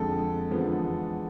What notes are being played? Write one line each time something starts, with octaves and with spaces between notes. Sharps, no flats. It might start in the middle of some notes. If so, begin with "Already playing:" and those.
Already playing: F2 D3 G#3 A4
E2 D3 F3 G#3 B3